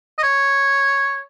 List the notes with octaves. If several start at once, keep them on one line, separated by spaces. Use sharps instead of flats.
D#5
C#5